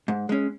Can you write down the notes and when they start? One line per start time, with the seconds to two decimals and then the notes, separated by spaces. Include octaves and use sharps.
0.08 G#2
0.29 G#3 C#4